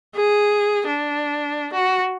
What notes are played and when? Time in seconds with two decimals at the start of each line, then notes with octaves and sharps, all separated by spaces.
0.15 G#4
0.87 D4
1.73 F#4